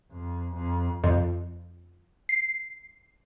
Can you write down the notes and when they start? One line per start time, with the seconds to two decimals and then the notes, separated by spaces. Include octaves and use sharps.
0.11 F2
0.54 F2
1.04 F2
2.29 C7